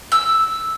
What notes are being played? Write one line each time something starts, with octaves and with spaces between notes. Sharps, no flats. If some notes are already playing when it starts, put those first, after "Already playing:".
E6